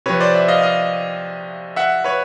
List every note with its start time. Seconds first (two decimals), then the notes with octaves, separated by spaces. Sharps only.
0.06 C3 F3 B4 C#5
0.20 C5 D5
0.34 D5 E5
0.48 D#5 F5
0.62 D#5 F5
1.76 E5 F#5
2.04 B4 C#5